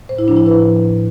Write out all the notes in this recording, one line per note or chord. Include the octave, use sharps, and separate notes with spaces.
A2 C5
E4
F3 D4
E4
A2 B4
F3
A2